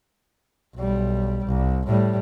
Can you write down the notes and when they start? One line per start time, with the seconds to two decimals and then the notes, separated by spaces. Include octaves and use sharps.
0.76 B1 G3
1.46 C2
1.87 A2 G3